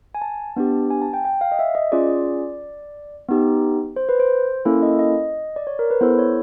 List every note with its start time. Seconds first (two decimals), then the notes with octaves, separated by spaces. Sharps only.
0.15 G#5
0.22 A5
0.56 B3 D4 G4
0.90 G#5
1.02 A5
1.13 G5
1.25 G5
1.41 F5
1.52 D#5
1.59 E5
1.75 D#5
1.92 C#4 F4 G#4 D5
3.28 B3 D#4 G4
3.96 C5
4.09 B4
4.19 C5
4.65 A#3 C#4 E4 A4
4.83 D#5
4.99 D#5
5.56 D5
5.67 C#5
5.79 A#4
5.90 B4
6.01 B3 E4 A4 C5
6.19 C#5